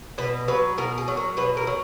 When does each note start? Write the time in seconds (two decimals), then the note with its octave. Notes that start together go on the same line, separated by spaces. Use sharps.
0.18 B2 B4
0.48 F#3 B4
0.78 B2 A#4
0.98 G#4
1.08 F#3
1.17 A#4
1.37 B2 B4
1.57 A#4
1.67 F#3